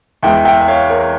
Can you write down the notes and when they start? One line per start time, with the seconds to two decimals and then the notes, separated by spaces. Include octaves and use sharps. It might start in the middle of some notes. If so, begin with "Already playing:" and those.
0.23 E2 E3 G#3 E5 G5
0.45 E5 G5
0.61 E5
0.68 C#5 F5
0.90 A#4 C#5